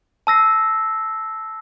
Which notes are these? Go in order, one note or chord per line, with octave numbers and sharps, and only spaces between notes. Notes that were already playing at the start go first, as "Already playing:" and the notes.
A5 E6 A#6 C7